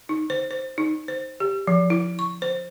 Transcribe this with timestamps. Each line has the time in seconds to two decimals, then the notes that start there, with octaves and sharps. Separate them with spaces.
0.09 D#4
0.30 C5
0.51 C5
0.78 D#4
1.08 C5
1.40 G4
1.67 F3
1.90 E4
2.19 C#6
2.42 C5